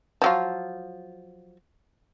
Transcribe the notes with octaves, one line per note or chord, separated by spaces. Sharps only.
F3 F#3 F4